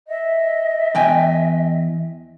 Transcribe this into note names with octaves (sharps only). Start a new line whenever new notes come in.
D#5 E5
E2 G5 G#5